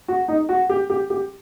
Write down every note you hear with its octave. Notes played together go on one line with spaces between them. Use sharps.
F#4
D#4
F#4
G4
G4
G4